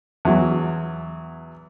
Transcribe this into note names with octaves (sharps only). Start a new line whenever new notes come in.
E2 F#3